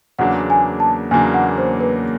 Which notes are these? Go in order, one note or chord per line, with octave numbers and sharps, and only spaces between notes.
E2 C#3 F#3 A#3 D4 F#5
G#5
A5
E2 C#3 F#3 A#3 D4 G#5
F#5
C5
B4